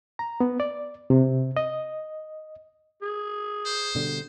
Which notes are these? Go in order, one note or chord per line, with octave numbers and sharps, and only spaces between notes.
A#5
B3
D5
C3
D#5
G#4
C5
B2 D3 G3